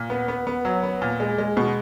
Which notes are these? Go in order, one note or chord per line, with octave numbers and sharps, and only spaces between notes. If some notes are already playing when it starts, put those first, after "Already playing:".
Already playing: A#2
B3
B3
B3
F#3
B3
A#2
G#3
G#3
B2